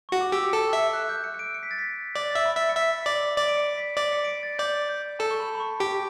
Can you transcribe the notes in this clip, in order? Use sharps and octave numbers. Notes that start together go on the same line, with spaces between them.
F#4 C#6
D6
G4 E6
A4
E5
F#6
G6
C#7
C#7
D7
C#7
B6
A6
B6
D5 A6
A6
E5
B5
E5 A6
C#7
E5 B6
D5
D5 D7
D7
C#7
B6
D5
C#7
D7
C#7
A6
D5 G6
G6
A4 A5
C#6
B5
B5
C#6
G4 D6